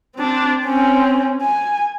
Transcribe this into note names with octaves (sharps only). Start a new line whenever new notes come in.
C4 D4
C4 C#4
G#5